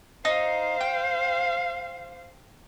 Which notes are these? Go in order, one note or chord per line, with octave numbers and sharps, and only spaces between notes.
D#4 C5 F5
G5